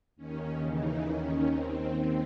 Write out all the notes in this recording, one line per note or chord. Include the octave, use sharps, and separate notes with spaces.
D#2 D#3 C#4
D#2 C#3 E3 D#4
D#2 D#3 C#4
D#2 D#3 C4